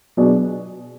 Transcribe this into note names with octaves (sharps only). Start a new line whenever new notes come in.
B2 F#3 B3 D4 G#4